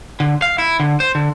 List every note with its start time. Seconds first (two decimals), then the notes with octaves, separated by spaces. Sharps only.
0.20 D3
0.42 F5
0.58 E4
0.80 D3
1.00 C5
1.15 D3